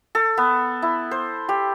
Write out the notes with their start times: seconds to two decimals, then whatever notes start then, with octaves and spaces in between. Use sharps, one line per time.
0.15 A4
0.37 B3
0.82 E4
1.11 C5
1.49 G4